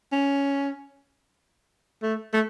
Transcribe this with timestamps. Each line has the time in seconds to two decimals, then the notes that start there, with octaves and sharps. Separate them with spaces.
0.12 C#4
2.02 A3
2.33 A3